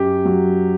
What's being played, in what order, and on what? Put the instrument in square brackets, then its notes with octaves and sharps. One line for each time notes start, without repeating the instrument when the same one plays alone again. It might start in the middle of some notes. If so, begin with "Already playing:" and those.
Already playing: [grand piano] F#2 G4
F#3